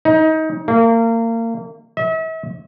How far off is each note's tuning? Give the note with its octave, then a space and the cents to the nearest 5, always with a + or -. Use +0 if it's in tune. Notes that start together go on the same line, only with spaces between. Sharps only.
D#4 +25
A#3 -30
E5 -40